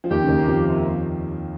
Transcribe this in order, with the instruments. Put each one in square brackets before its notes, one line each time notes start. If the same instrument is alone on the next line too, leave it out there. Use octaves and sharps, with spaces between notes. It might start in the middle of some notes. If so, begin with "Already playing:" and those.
[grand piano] F3
[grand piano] D#2 D#3 [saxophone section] G4
[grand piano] C#3
D#2 D#3
[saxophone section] A#3
[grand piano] F2 F3
[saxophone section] C3